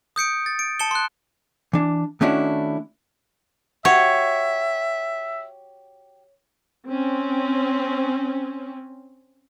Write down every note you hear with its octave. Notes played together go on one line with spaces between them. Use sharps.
D#6 G6 C#7 D7
A6
D7
A5 C#7 E7 G7
C6 F#6
E3 D4
D#3 A3 C#4 D4 E4 F#4
F#4 G4 C#5 E5
C4 C#4